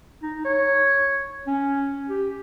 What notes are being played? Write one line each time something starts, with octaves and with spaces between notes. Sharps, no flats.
D#4
C#5
C#4
G4